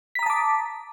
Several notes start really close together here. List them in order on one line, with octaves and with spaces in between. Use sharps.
B6 A#5 D#6 A5 D6